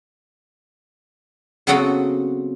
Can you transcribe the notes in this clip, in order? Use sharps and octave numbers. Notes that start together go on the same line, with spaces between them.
C#3 F#3 B3 C4 F#4 A4